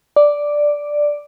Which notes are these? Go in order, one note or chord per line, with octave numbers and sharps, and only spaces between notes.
D5